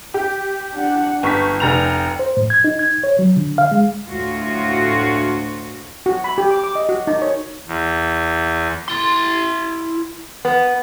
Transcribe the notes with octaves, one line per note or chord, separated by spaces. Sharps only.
G4
D4 F#5
G1 G5 C#6 B6
F1 A#5 F7
C5
A2
G#6
D#4
G#6
C#5
F#3
D3
F5
G#3
D2 A2 F4 F#4
F#4
B5
G4
D6
D6
D#5
F#4
D#4
C#5
E2
E4 C6
B3